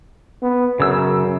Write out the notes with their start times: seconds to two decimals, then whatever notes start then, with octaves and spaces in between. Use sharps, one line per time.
0.42 B3
0.80 F#2 C#3 E6